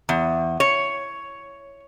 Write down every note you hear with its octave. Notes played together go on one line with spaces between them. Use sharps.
E2
C#5